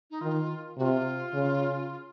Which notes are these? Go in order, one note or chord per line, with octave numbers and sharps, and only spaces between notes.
D#4
D#3 F4
C3 F4 F#4
C#3